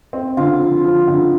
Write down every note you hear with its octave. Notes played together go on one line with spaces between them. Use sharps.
C4
D3 F4
F3
F3
D3